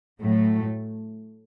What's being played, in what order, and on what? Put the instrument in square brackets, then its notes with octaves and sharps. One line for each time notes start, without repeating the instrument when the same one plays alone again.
[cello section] A2 F#3 A3